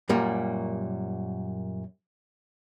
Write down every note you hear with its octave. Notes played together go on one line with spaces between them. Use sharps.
F#2 A#2 G3 A#3